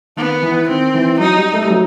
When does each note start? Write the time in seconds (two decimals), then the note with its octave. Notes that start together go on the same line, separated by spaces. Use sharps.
0.17 D#3 B3
0.42 E3
0.68 D#3 C4
0.94 E3
1.19 F#3 D#4
1.37 G3
1.54 A3
1.65 G3
1.70 F#3